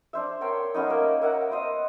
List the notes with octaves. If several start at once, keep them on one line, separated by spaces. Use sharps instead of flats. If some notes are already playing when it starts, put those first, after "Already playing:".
D4 C5 E5
A#4 C#5 G5 C6
A3 B3 C#4 D#4
A#3 A#4
A#4 E5 F#5
B3 C5 D#5